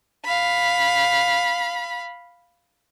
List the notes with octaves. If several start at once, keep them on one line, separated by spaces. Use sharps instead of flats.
F5 B5